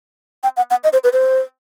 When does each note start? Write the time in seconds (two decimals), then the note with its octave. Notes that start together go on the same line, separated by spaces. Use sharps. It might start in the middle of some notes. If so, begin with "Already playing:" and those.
0.43 G5
0.57 F#5
0.71 F#5
0.84 D#5
0.93 C5
1.04 B4
1.13 C5